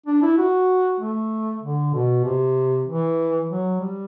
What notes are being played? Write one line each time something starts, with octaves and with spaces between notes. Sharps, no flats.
D4
E4
F#4
A3
D3
B2
C3
E3
F#3
G3